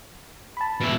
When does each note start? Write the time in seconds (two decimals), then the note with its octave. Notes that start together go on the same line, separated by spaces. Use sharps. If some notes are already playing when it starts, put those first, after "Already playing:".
0.57 A5 B5
0.80 B2 E4